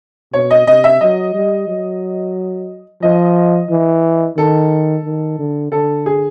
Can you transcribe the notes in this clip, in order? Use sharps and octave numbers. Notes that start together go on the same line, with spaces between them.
B2 C#5
D#5
C3 D#5
E5
F#3 D#5
G3
F#3
F3 D#5
E3
D#3 A4
D#3
D3
D3 A4
G#4